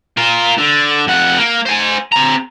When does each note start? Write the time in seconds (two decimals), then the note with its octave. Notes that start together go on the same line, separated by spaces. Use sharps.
0.17 F4 A#4
0.58 D3
1.07 F2 F#5
1.38 A#3
1.65 C5 G#5
2.12 C4 A#5